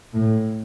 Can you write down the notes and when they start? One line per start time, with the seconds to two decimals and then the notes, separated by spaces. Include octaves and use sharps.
0.14 A2